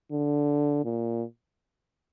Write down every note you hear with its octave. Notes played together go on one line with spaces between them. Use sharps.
D3
A#2